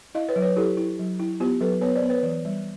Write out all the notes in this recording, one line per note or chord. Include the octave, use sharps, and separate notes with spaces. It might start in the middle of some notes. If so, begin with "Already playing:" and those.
E4 D#5 F5
B4 C#5
F#3
B4 C#5
E4 G4 A4
E4
F#3
E4
B3 F4 G4
F#3 A4 B4
B3 B4 C#5
C5 D5
B3
B4 C#5
E3
G3